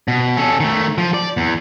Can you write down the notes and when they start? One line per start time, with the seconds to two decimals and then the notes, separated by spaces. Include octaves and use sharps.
0.08 B2
0.37 C#4 A4
0.60 D#3 A3
0.98 F3
1.14 D5
1.37 E2